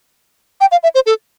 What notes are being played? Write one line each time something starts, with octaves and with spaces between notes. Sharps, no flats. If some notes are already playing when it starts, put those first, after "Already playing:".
G5
F5
E5
C5
A4